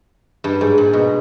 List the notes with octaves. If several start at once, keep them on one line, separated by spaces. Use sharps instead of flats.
G2
G#2
A#2
B2